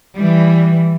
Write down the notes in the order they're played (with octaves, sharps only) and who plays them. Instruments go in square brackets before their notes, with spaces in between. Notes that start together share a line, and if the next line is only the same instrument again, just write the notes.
[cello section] E3 G3